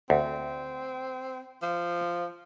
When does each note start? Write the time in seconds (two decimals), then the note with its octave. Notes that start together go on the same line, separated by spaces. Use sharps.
0.10 D2 C4
1.63 F3